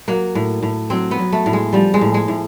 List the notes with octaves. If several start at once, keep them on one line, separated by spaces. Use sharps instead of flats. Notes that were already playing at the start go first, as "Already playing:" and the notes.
F#3 A#3
A2
A2
F#3 C4
B3
F#3
A3
A2
G#3
F3 G3
G#3
A2
G#3
A2